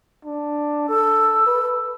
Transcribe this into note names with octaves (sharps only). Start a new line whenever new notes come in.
D4
A4 E6
B4